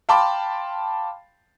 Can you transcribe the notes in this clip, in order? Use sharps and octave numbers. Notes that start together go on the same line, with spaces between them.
F5 G5 A5 B5 C6 D6